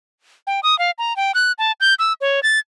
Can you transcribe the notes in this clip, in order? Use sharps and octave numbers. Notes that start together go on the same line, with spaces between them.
G5
D#6
F5
A#5
G5
F#6
A5
G6
E6
C#5
A6